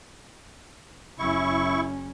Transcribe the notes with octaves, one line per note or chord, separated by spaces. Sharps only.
F#1 C#4 E4 C#6